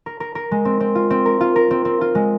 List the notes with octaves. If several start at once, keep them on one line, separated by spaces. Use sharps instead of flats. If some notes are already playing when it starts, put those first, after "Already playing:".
A#4
A#4
A#4
G#3
C4
C4
F4
C4
A#4
F4
A#4
C4
C4
F4
G#3